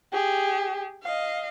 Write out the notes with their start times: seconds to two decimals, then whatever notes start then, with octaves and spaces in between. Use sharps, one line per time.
0.13 G4 G#4
1.03 D#5 F5